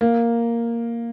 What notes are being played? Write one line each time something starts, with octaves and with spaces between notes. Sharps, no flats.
A#3